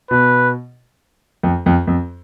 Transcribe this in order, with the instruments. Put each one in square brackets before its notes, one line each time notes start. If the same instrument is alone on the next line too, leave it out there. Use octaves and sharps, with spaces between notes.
[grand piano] B2 [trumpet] B4
[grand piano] F2
F2
F2